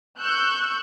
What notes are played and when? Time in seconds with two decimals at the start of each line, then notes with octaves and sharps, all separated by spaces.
0.19 C#6 E6 F#6 G6